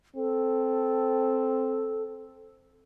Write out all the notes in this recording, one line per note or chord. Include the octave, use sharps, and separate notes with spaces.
C4 A4